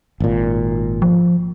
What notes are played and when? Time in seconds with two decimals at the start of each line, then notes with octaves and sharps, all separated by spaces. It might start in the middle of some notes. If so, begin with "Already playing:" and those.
0.20 G#1 A#2
1.02 F3